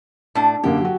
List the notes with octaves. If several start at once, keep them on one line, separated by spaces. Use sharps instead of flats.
A2 D4
F#2 D3 A#3 G4
F#3 F#4